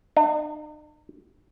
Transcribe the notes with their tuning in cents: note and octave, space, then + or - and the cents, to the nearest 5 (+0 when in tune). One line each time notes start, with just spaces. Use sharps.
D#4 -45